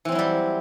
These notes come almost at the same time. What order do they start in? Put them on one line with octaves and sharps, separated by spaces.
E3 C4 F#3 E4 G3